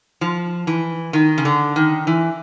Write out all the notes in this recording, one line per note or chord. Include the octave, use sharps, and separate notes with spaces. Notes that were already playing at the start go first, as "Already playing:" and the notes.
F3
E3
D#3
C#3
D3
D#3
E3